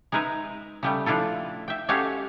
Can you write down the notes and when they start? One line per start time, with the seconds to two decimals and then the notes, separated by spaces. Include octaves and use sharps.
0.12 G#3 D#4 A#4 B4 E5
0.83 C#3 G3 A3
1.06 F3 D4 E4 F4 A4
1.68 E5 G5
1.88 G#3 C#4 F#4 G4 A4 F5